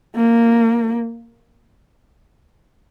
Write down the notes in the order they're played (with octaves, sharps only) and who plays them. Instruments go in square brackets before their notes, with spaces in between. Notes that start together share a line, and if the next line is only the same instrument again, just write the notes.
[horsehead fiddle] A#3